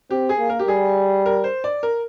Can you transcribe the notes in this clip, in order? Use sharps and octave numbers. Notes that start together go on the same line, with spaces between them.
C4 G4
G#4
A#3
A#4
G4
G3 G#4
A#4
C5
D5
A#4